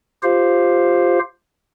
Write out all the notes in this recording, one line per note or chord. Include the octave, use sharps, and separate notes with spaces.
F4 G4 C5 F5